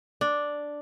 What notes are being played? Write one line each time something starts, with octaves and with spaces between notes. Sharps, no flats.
D4